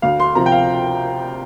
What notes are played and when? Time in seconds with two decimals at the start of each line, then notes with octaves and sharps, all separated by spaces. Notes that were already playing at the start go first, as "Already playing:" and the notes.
0.02 D2 F5
0.20 C6
0.35 C3 F3 A#5
0.46 G5
0.52 F5